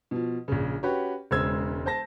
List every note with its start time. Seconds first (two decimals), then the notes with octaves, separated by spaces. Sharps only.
0.11 B2 F3
0.48 A#1 C#3
0.83 C#4 F#4 G4 B4 C#5
1.31 E1 C#3 G#3 C5 E6 G#6
1.86 C5 A5 A#6